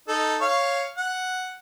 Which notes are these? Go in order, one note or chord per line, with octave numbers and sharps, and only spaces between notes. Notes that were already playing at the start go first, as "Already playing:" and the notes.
D#4 A4
C#5 F5 C#6
F#5